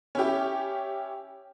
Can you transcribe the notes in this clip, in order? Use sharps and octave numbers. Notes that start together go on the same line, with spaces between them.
C#4 E4 G4